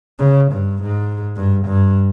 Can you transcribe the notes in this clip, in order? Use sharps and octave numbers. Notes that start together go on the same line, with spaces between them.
C#3
G2
G#2
G2
G2